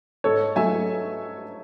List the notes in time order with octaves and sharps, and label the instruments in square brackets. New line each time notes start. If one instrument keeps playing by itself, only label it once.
[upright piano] G#2 A4 C#5
F#3 A3 E5 G#5